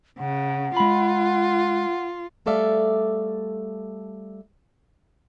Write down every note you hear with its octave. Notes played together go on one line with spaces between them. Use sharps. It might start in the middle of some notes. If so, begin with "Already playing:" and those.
C#3 F#5
G#3 F4 B5
G3 A3 A4 D5 E5 F5